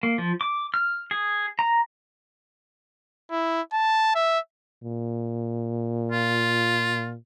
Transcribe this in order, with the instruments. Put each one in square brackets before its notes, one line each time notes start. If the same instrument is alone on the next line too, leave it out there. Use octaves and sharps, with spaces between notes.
[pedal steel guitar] A#3
F3
D6
F6
G#4
A#5
[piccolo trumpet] E4
A5
E5
[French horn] A#2
[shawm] F4